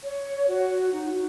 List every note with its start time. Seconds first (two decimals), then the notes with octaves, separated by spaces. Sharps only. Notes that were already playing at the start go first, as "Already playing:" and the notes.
0.04 C#5
0.48 F#4
0.92 D#4
1.07 F#4